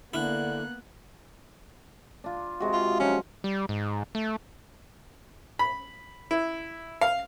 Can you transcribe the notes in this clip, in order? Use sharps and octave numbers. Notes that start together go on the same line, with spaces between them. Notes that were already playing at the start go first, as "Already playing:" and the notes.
D3 A#3 B3 E4 F#6
D4 F4
C3 G#3 F#4
F4
F3 F#3 C#4 D#4
G3
G#2
A3
B5
E4
F5